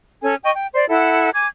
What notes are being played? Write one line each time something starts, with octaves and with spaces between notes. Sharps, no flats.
C#4 A4 G#5
D#5 G5 C#6
G5
C5 D5
E4 A4 F#5
G#5 D6 G#6